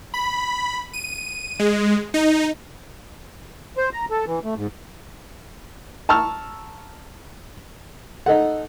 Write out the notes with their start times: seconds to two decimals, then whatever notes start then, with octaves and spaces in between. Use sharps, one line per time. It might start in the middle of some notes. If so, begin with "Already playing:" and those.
0.14 B5
0.93 D#7
1.59 G#3
2.14 D#4
3.77 C5
3.93 A#5
4.10 A4
4.26 E3
4.45 A3
4.57 G#2
6.09 A5 A#5 C#6 E6 F6
8.26 D#4 A4 F#5